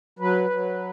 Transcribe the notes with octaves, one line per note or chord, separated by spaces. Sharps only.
F#3 B4
F#3